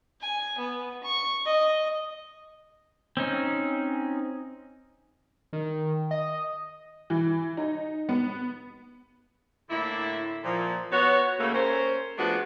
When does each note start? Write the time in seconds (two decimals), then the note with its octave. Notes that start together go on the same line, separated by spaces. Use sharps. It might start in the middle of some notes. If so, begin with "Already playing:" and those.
0.21 G#5
0.58 B3
1.03 C#6
1.45 D#5
3.17 C4 C#4 D#4
5.53 D#3
6.11 D#5
7.10 E3
7.57 D#4
8.09 B3
9.70 A2 D3 A#3 E4
10.44 A#2 F3
10.92 B3 F#4 C#5
11.40 C#3 A3 A#3
11.54 C#4 A#4 C5
12.18 F3 A3 B3 D4 F#4 G#4